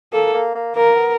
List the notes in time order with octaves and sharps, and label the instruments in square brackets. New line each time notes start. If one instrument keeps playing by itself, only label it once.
[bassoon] A#3 [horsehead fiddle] A4
[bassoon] A#3
A#3
[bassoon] A#3 [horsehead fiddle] A#4
[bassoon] B3